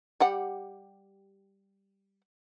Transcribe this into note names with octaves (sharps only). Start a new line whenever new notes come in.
G3 G4 F#5